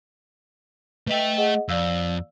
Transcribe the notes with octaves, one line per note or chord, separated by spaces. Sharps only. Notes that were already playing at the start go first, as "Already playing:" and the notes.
A3 B4 D#5 E5 G5
G#4 D#5 F#5
F2 D5 F5 E6